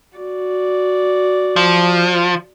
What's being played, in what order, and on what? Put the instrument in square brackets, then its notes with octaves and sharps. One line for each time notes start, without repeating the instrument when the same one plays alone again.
[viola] F#4 D5
[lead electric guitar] F3